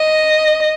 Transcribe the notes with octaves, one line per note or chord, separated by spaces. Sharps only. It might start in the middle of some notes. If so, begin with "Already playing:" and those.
Already playing: D#5